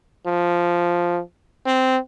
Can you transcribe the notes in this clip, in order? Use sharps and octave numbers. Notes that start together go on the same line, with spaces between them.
F3
C4